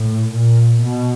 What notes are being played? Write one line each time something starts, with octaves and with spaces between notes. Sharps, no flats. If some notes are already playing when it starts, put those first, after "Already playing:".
Already playing: A2
A#2
B2